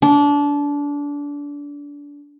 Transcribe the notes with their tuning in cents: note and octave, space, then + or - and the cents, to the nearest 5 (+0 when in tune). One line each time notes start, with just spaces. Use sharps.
D4 -25